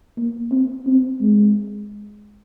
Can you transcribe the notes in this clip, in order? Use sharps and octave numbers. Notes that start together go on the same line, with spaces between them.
A#3
C4
C4
G#3